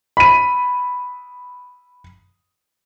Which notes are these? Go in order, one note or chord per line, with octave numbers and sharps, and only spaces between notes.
B5 D#7